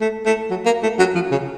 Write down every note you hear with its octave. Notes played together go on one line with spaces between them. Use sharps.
A3
A3
F#3
A#3
A3
F#3
F3
C#3